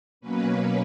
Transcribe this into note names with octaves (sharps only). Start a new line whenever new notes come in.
B2 F#3 A#3 C#4 B4